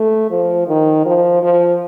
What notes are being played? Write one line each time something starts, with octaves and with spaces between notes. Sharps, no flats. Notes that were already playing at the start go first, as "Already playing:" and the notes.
Already playing: A3
F3
D#3
F3
F3